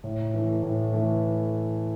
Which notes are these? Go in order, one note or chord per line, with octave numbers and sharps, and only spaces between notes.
A2
E3 A3
A2
E3 A3